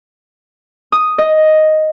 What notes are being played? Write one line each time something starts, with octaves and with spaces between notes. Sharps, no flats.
D#6
D#5